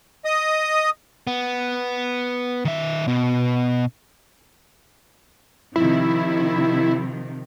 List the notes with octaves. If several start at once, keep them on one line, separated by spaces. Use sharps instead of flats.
D#5 D#6
B3
D#3 E5
B2
C3 D#3 F3 E4